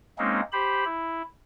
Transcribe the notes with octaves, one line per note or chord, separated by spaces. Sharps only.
G#3 A#3 C4 C#4 D#4
G4 C5 B5
E4